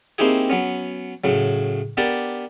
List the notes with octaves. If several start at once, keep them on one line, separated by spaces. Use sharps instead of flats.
A#3 C4 D#4 E4 G4 G#4
F#3 B3 C#4
A2 C#3 F#3
B3 D4 G4 A#4 D5